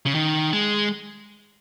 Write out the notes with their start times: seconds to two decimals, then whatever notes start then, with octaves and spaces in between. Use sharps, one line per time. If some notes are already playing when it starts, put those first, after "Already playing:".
0.06 C#3
0.15 D#3
0.53 G#3